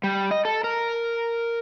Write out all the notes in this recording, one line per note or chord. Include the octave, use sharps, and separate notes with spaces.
G3
D#5
A4
A#4